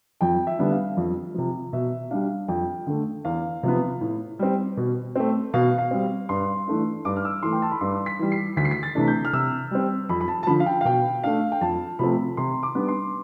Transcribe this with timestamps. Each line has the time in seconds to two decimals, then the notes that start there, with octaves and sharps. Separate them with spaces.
0.21 F2 G5
0.47 E5
0.59 D3 G3 B3 D4
0.72 F5
0.97 F2
1.35 C3 F3
1.73 B2 E5
2.11 G3 D4 F5
2.48 F2 G5
2.87 D3 A3
3.25 E2 F5
3.63 C3 F3 B3
4.01 A2
4.39 G3 C4
4.77 B2
5.15 A3 C4
5.54 B2 F5
5.78 F5
5.91 G3 C4
6.29 G2 C6
6.68 E3 A3 D4
7.05 G2 D6
7.16 F6
7.25 E6
7.43 E3 A3 C6
7.52 G5
7.62 A5
7.71 B5
7.81 G2 C6
8.06 B6
8.19 E3 G3
8.32 C7
8.57 D2 B6
8.65 C7
8.71 B6
8.83 A6
8.95 C3 E3 A3 D4
9.08 G6
9.25 F6
9.33 C3 E6
9.71 G3 C4
10.09 F2 B5
10.21 B5
10.28 A5
10.43 A5
10.47 D3 F3 B5
10.60 F5
10.66 G5
10.81 F5
10.85 B2 G5
11.23 A3 D4 F5
11.52 G5
11.61 F2 A5
11.99 C3 F3 A3 C4 B5
12.37 C3 C6
12.63 D6
12.75 G3 B3 D4
12.88 C6